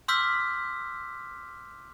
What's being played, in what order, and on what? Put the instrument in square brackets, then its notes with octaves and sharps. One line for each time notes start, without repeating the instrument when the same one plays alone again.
[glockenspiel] C6 D6 E6 F6 G6 B6